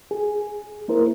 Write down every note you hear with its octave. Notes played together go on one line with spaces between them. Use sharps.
G#4
A#3 E4 A#4 C5